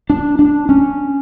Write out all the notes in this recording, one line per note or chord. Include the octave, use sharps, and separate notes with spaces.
D4
D4
C#4